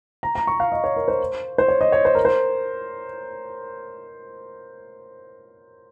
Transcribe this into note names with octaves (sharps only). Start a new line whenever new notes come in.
A#5
A#5
C#6
F5
D#5
C#5
A#4
C5
C5
C#5
D#5
C#5
C5
A#4
C5